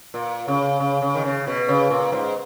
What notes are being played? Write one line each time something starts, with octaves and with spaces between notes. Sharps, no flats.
A#2
C#3
C#3
C#3
D#3
C#3
B2
C#3
A#2
G#2